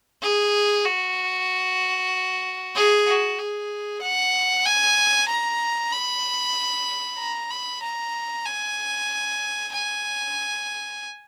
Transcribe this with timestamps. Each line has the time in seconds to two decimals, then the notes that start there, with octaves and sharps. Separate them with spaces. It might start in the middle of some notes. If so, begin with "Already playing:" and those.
0.22 G#4
0.85 F#4
2.75 G#4
3.07 F#4
3.39 G#4
4.02 F#5
4.65 G#5
5.28 A#5
5.92 B5
7.19 A#5
7.50 B5
7.82 A#5
8.46 G#5
9.72 G#5